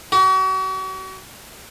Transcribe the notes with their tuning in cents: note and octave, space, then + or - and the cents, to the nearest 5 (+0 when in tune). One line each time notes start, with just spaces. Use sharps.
F#4 +40